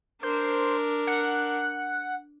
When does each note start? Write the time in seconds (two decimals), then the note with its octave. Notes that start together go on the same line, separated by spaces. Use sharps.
0.23 D4 A#4 C5
1.07 F#5